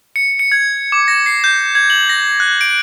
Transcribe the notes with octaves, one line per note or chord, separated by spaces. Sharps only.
C#7
C#7
G#6
D6
A#6
C7
G6
G#6
F#7
A#6
F#6
D7